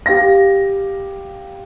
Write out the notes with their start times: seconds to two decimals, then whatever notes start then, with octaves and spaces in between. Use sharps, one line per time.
0.06 G4 F5 A#6